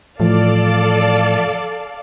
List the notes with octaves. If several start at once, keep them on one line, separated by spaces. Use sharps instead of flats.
A2 E3 F3 A4 D5 F5